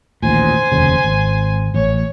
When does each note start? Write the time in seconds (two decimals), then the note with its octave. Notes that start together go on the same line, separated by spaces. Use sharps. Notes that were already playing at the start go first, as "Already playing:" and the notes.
0.23 A1 D#2 A#2 C5 G#5
0.72 F1 D#2 C#3
1.04 G#1
1.74 A1 C#5